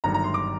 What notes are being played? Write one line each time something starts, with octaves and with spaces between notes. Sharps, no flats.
G1 G2 D#3 F#3 A#5
A#5
C6
D6